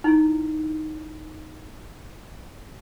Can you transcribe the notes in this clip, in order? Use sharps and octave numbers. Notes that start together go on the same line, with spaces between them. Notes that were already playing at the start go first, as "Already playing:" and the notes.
D#4 E4